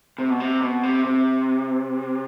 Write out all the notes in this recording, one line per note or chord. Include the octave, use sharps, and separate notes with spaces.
C3
B2
C3
B2
C3
C3